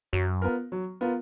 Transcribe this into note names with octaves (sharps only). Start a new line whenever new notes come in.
F#2 F#3
B3 F4 A#4
F#3
B3 F4 A#4